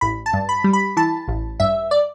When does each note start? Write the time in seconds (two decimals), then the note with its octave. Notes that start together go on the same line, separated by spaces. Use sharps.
0.01 A1 B5
0.26 A5
0.33 G2
0.49 B5
0.64 G3
0.73 B5
0.97 E3 A5
1.28 A1
1.60 G2 E5
1.91 D5